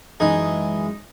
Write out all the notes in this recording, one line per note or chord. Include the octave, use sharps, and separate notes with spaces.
F#2 E3 G#3 D#4 G#4